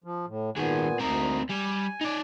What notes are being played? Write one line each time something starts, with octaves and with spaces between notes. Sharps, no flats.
F3
A2
A#2 D#3 G#3 B3 G#5
D2 C4 D#4 A#4
G3 G#5
D#4 D5